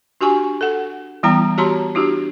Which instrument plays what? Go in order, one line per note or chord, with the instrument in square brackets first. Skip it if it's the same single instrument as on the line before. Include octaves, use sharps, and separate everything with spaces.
[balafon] D4 F#4 G4 G#5 C#6
A4 F#5
E3 G3 B3 E4 G5 A#5
F#4 G4 C#5 A5 A#5 C6
D4 E4 F#4 G4